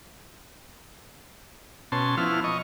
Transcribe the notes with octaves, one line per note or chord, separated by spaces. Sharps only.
B2 C#4 A5 C6
F3 B3 E4 F6
D#5 C#6